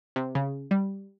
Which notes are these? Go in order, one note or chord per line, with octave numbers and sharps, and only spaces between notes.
C3
C#3
G3